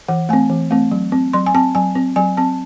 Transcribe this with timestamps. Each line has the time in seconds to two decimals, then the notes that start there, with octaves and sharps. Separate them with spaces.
0.08 E3 F#5
0.29 A3 C4 G#5
0.50 E3
0.71 A3 C4
0.92 F#3
1.12 C4
1.33 F#3 C6
1.46 G#5
1.55 C4 A5
1.75 F#3 G#5
1.95 C4
2.16 F#3 G#5
2.37 C4 A5